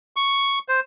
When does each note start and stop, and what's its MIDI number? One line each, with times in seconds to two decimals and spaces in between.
0.16 0.59 85
0.68 0.80 72